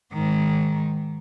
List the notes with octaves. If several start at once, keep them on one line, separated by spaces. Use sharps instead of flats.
G#2 D#3